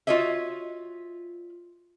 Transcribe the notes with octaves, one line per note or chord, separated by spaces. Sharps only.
F4 F#4 C#5 D#5 E5